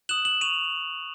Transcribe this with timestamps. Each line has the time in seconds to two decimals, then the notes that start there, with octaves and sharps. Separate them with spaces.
0.09 D#6 F#6 E7 F#7
0.25 E7 F#7
0.41 C#6 D#7 F7